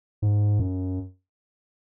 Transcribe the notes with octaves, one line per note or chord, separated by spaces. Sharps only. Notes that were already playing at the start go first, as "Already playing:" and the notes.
G#2
F#2